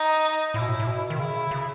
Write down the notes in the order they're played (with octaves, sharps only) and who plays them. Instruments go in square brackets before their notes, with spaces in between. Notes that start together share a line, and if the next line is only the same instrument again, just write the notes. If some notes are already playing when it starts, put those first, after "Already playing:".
Already playing: [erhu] D#4
[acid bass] A2 [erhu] E4
[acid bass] B2
A2
A2
B2
D#3
[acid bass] C#3 [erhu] E4
[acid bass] C#3